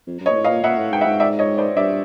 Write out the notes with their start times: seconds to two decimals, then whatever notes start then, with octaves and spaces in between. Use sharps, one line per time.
0.07 F2
0.21 F#2
0.26 C#5 D#5
0.30 A#2
0.36 A2
0.44 D#5 F5
0.49 A#2
0.63 A#2 E5 F#5
0.78 A2
0.92 G#2 G5
1.01 E5 F#5
1.06 G#2
1.20 D5 E5
1.39 C#5 D#5
1.58 C5 D5
1.77 G2 D5 E5